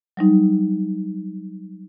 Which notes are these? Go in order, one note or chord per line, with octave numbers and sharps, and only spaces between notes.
F#3 G3 D#4